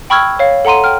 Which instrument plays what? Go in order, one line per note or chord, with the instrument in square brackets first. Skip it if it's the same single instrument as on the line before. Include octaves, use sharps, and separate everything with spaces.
[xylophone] G5 B5 C#6 E6 F6 G#6
C#5 F5
A4 F#5 A#5 C6 D#7
G5 F6